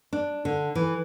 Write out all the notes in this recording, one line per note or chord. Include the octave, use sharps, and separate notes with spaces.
D4
D3
E3